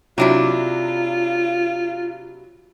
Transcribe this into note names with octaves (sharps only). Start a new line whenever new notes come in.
C3 F#3 D4 E4 F4